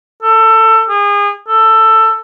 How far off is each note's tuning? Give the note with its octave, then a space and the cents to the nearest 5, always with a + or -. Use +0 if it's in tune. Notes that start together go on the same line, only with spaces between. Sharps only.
A4 +20
G#4 -35
A4 +15